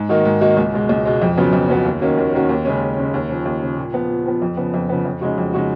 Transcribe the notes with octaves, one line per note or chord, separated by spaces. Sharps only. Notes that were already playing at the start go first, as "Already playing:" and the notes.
Already playing: G#2
D#3 A#3 D#4 F#4
G#2
D#3 A#3 D#4 F#4
C#2
B2 G#3
C#2
B2 G#3
F2
C#3 F#3 B3 F4
F2
C#3 F#3 B3 F4
D#2
D#3 A#3 C#4 F#4
D#2
D#3 A#3 C#4 F#4
D#2
C#3 G#3 C#4
D#2
C#3 G#3 C#4
D#2
C#3 F3
D#2
C#3 F3
A#2
F3 B3
A#2
F3 B3
F2
C#3 F3 B3
F2
C#3 F3 B3
F2
C#3 G#3 D#4 F#4
F2
C#3 G#3 D#4 F#4